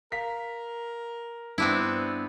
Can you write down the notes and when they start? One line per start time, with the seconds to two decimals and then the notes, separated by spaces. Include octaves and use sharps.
0.12 A#4 F5 B6
1.58 G2 B3 C4 D4 E4